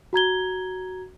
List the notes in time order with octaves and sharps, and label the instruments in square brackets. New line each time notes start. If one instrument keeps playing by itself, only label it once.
[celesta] F#4 A#5 G#6 G7